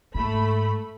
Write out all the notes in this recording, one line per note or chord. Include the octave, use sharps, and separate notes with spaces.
G#2 A3 B5